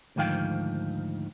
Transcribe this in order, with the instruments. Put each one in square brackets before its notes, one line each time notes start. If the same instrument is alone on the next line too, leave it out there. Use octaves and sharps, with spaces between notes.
[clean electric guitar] D2 G#2 D#3 F3 F5 G5